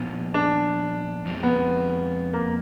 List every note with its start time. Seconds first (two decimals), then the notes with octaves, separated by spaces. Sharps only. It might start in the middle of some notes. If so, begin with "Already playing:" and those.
Already playing: A#2 F3 B3
0.34 D4
1.25 F2 F3 G#3
1.43 B3
2.33 A#3